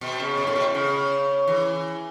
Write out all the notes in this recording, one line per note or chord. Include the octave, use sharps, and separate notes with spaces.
B2
C#3
B2
A2
B2
C#3
E3